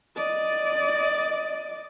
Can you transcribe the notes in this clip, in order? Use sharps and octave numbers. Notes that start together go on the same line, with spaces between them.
D5 D#5